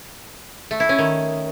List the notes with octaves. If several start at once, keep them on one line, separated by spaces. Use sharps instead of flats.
A3
E4
C#4
D#3